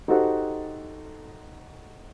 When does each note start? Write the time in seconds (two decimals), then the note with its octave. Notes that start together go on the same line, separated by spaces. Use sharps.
0.08 D#4 F#4 G4 A4 C5 F#5